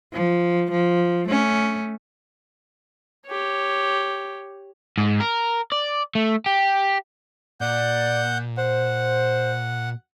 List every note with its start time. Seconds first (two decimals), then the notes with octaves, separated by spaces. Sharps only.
0.13 F3
0.71 F3
1.28 A3 C#4
3.26 G4 C#5
4.98 G#2
5.20 A#4
5.72 D5
6.15 A3
6.46 G4
7.61 A#2 D5 F#5 G6
8.57 C5 F#5